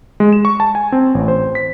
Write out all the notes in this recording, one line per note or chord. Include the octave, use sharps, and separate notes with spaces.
G#3
E7
C#6
A5
G#5
C4
A1
C5
B6